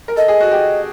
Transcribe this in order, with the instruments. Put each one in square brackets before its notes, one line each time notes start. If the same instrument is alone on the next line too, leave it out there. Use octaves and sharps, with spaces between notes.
[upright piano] A#4
[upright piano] A4 [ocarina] D#5
[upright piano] G#4
F#4
G4